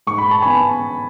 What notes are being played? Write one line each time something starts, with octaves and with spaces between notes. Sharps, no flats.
G#2 C#6
B5
A5
B3 G#5 B5